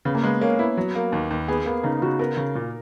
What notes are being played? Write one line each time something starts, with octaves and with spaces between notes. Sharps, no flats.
C#3 B3
A#3
G#3 B3
A#3 C#4
B3 E4
F#3
A#3
D#2
D#2
B3 G#4
A#3 B3
C#3 D#4
C#3 F#4
B3 A#4
C#3
A#2